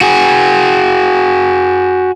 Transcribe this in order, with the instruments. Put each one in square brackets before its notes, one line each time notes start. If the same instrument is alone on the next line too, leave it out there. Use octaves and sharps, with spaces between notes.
[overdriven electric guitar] F#4 G#4